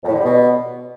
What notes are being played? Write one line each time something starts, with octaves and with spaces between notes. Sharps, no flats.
F2
A2
D3
G3
B2